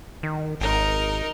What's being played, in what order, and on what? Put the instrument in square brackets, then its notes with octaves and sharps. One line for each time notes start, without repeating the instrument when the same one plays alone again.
[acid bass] D#3
[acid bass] G#1 [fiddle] D#4 A#4